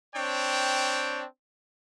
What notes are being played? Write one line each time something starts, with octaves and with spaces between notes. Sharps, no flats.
C4 D4 C#5 G5